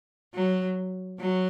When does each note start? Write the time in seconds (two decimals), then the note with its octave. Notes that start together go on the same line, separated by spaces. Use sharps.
0.34 F#3
1.20 F#3